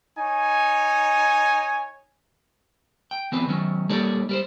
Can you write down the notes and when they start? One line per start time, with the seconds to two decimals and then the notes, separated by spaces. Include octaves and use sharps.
0.18 D#4 C#5 G#5
3.11 G5
3.32 E3 B3 C4 B4
3.47 D#3 F#3 C#4
3.89 G3 A#3 D#4 A4 C#5 D5
4.29 G3 A#4 C5